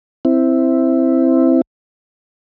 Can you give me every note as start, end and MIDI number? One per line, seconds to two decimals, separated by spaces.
0.25 1.62 60
0.25 1.62 64